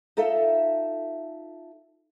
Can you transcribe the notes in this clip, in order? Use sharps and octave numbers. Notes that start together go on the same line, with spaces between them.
D#4 F4 A4 E5